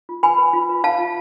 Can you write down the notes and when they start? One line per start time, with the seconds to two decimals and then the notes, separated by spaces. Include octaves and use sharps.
0.09 F4
0.23 B4 G#5 B5
0.38 B4
0.53 F4
0.69 B4
0.84 F4 F5 A5
0.98 F4